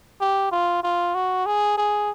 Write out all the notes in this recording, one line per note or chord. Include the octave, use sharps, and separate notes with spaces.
G4
F4
F4
F#4
G#4
G#4